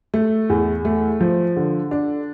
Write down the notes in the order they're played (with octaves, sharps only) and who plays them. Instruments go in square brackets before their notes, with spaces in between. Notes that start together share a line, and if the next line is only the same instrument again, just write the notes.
[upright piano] A3
E2
A3
F3
D3
D4